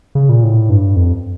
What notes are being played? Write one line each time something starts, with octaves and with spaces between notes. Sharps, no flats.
C#3
A#2
A2
G2
F2